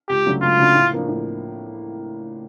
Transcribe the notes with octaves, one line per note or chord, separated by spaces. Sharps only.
C#2 G4
C#3 F#3 A3 D4
C#2 F4
C#3 F#3 A3 D4
A2
F3 A#3 D4
A2